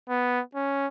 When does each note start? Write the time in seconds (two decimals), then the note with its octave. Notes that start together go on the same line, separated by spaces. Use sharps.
0.08 B3
0.55 C#4